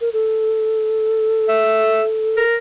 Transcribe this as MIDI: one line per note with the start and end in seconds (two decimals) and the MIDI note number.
0.01 0.09 70
0.13 2.43 69
1.48 2.03 76
2.37 2.56 70